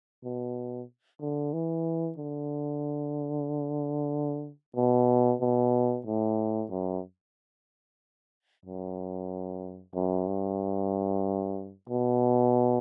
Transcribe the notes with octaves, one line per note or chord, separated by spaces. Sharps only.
B2
D3
E3
D3
B2
B2
A2
F#2
F#2
F#2
G2
B2